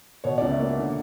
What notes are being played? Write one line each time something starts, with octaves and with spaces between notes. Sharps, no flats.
B2 C#5
C#2 D5
E5
A#3
D3